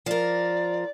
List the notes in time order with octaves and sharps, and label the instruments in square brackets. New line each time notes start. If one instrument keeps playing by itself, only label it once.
[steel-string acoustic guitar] F3 A#4 [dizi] D5